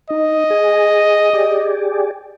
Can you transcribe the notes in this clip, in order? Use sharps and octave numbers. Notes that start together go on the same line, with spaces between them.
D#4 D#5
G#4
G4 G#4 D5